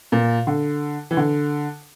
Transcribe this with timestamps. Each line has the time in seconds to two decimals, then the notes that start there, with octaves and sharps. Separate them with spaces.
0.12 A#2
0.47 D3
1.11 E3
1.17 D3